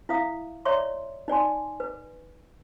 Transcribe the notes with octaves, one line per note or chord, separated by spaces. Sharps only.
E4 E5 F5 D#6
C#5 D5 E5 A#5 C6 C#6
D#4 D5 G#5 C6
B4